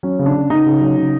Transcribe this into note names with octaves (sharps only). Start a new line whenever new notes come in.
F#3 C#4
C#3
D4
C#3
C#3 D#4
C#3
F#3
C#3